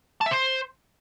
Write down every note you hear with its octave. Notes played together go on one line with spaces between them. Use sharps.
A5
E5
C5